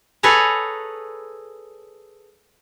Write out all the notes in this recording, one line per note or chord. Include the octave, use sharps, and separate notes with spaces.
G#4 A4 B4 C#5 G#5 A#5